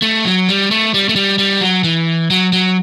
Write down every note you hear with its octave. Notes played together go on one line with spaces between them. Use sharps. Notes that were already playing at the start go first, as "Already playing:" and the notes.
A3
F#3
G3
A3
G3
A3
G3
G3
F#3
E3
F#3
F#3